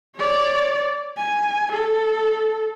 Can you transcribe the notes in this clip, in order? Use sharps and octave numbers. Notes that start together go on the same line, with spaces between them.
C#5 D5
G#5
A4